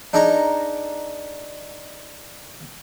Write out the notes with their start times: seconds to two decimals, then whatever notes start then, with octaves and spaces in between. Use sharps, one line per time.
0.13 D4 D#4 G#4 D#5 A#5 C#6